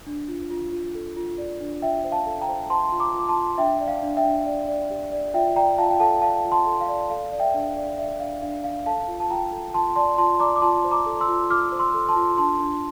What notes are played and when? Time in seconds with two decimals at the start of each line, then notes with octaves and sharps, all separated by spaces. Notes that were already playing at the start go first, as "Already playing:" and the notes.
0.07 D4
0.28 F4
0.51 F4
0.73 F4
0.95 A4
1.16 F4
1.38 D5
1.61 D4
1.82 F4 E5 G5
2.04 C5
2.12 F5 A5
2.26 A4
2.41 G5 A#5
2.49 C5
2.70 C5 A5 C6
2.92 F4
3.00 A#5 D6
3.14 F4 D6
3.29 A5 C6
3.36 F4
3.58 D4 E5 G5
3.80 D5
3.88 F5
4.03 D4
4.17 E5 G5
4.25 D4
4.46 D5
4.68 D5
4.91 G4
5.12 D5
5.34 F4 E5 G5
5.56 D5 G5 A#5
5.78 F4 F5 A5
5.90 G5
6.00 A4 F5 A5
6.22 D5 F5 A5
6.45 F4
6.52 A5 C6
6.66 A4
6.81 F5
6.88 D5
7.10 A4 F5
7.32 D5
7.40 E5 G5
7.54 D4
7.69 F5
7.77 D5
7.98 D5 E5
8.20 D4 F5
8.42 D4 F5
8.64 D4 F5
8.86 A4 F5 A5
9.08 F4
9.20 A5
9.30 F4 G5 A#5
9.52 A4
9.74 F4 A5 C6
9.96 D5 A5 C6
10.18 F4 A5 C6
10.40 D5 A#5 D6
10.56 D6
10.62 F4 A5 C6
10.84 C5
10.91 A#5 D6
11.06 A4
11.20 C6 E6
11.28 F4
11.50 F4 D6 F6
11.72 C5
11.79 C6 E6
11.94 A4
12.09 A5 C6
12.16 F4
12.38 D4 A5 C6
12.60 D4